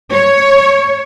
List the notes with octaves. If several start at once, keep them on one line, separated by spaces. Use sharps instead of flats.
C#5